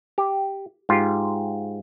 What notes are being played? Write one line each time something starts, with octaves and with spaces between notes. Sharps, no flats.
G4
G#2 F4 G4